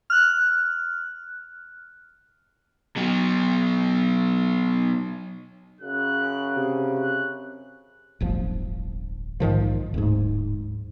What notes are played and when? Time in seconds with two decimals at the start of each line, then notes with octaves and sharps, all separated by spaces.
0.10 F6 F#6
2.96 B2 F#3
5.81 F#2 C#3 F#6
6.57 C3
6.99 F#6
8.20 D1 G1 F3
9.40 A#1 G#2 D#3 F3
9.94 D1 G#2